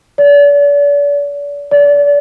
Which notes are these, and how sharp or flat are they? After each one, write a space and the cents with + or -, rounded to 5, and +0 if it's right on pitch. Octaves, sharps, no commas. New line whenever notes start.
D5 -40
D5 -30